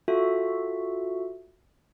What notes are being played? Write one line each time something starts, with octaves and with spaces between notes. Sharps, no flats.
F4 F#4 A4 E5